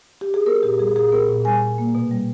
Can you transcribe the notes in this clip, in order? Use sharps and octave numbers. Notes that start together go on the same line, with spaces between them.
G4
G#4
B3 A#4
A#2 G4
G3 G#4
A#2 G#4
B3 A#4
A#2
G3 G#5
A#2
A#3
B2
G3